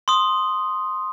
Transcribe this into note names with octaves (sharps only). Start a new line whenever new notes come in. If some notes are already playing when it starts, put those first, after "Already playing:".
C6 D#6